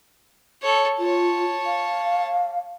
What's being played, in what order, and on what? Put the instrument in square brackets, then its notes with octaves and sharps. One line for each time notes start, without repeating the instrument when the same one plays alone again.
[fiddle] A4 C#5
[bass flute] F4 [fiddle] C#5 A5
[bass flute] F5